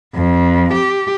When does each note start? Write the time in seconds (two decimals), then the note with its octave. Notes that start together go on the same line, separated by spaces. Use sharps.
0.15 F2
0.73 G4